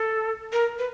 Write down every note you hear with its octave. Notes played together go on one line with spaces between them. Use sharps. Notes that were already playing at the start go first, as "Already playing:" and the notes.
Already playing: A4
A#4
B4